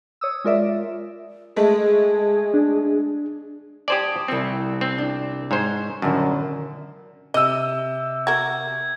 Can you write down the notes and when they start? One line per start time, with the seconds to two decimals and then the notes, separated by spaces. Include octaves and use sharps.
0.21 C#5 D#6 E6
0.44 G#3 F4 A#4 D5 E5
1.56 G#3 A3 G#4
2.54 D4
3.88 G4 C5 D5 G#5 A5 D#6
4.28 C2 C4 E6 C#7
4.81 C4
4.98 D4
5.51 G#2 C5 C#5
6.02 D#1 F#2 D3 A5
7.34 C3 D#5 E6 D#7
8.27 F#4 A#4 G#6